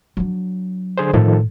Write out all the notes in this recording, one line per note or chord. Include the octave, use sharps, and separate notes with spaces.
F#3 D4
D3 G#4 C5
A2 D#3 F3 A4